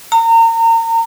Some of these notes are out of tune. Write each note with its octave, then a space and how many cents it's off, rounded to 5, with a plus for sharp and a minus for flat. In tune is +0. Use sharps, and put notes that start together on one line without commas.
A#5 -35